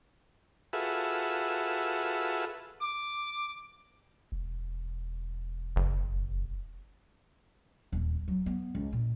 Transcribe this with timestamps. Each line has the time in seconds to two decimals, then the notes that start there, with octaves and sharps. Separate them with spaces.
0.73 F4 F#4 G#4 A4 B4 E5
2.81 D6
4.32 E1
5.76 F#1
7.92 D#1
8.28 F#3
8.46 B3
8.75 C#2
8.93 A#2